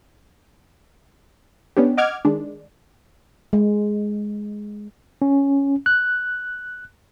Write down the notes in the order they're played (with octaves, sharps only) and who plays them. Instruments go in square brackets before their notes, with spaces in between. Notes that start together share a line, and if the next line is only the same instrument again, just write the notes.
[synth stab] B3 C#4 D4 G4
D#5 F#5 D6 F6 G#6
D#3 G#3 D4
[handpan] G#3
[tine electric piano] C#4
F#6